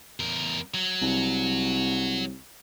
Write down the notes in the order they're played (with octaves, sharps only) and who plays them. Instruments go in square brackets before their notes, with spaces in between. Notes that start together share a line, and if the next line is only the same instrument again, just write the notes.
[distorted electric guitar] E2 A#4
F#3
[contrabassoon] C2